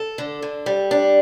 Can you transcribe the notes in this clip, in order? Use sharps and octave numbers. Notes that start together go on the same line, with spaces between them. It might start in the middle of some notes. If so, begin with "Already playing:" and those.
Already playing: A4
D3
D3
G3
D4